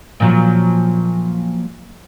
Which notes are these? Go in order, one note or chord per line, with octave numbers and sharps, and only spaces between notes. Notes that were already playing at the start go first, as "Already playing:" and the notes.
A#2 F3 F#3